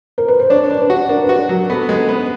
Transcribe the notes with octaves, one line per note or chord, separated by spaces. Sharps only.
A#4
B4
C5
D4 C#5
D4
B4
F#4
D4 A#4
B4
F#4
A#4
F#3
B3 A4
G#3 A#4
B3 B4